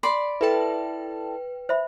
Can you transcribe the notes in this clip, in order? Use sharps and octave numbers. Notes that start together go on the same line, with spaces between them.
D5 B5 C6
E4 A4 B4 G5 A5
C5 E5 B5